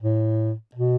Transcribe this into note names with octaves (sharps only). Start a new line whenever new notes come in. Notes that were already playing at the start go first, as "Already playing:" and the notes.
A2
B2